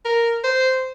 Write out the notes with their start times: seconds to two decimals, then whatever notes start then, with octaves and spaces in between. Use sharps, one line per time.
0.05 A#4
0.44 C5